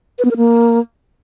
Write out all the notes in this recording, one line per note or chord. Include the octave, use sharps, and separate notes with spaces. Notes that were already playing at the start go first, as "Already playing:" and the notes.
B4
B3
A#4
A#3